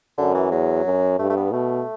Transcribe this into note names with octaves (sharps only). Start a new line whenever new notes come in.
F#2 D3
E3
E2 F#3
F#2
G2 A3
A3
B3
B2 A3